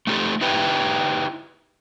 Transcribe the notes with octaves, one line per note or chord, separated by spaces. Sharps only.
A3 D#4 G4 A4
D#4 E4 G4 B4